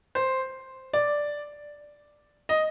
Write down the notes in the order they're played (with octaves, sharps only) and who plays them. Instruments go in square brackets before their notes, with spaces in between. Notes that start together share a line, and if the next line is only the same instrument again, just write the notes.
[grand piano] C5
D5
D#5